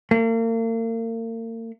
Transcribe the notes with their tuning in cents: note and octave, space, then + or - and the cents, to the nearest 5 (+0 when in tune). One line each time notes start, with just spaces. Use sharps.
A#3 -40